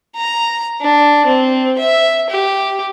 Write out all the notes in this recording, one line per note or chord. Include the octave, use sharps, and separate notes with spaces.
A#5
D4
C4
E5
G4